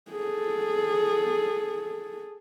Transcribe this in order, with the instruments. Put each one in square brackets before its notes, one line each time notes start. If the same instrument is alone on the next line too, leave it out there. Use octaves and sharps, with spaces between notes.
[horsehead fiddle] G#4 A4